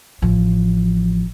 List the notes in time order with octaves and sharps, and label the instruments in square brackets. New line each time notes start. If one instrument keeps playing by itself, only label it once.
[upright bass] A1 F3